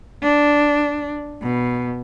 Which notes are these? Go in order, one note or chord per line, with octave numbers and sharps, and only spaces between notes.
D4
B2